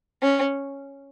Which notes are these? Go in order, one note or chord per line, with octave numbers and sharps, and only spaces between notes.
C#4